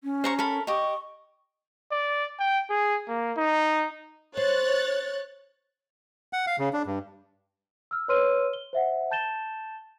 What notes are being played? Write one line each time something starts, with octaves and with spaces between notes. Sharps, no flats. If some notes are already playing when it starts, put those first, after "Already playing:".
C#4
C5 A#5 C#6
A4 A#4 B5
G4 D#5 C#6
D5
G5
G#4
A#3
D#4
C5 C#5 F#6 A6
F#5
F5
C#3
D4
G2
E6 F6
B4 C#5 C6 E6 F6 D#7
G7
C5 E5 F#5
A5 G6 A6 E7 G7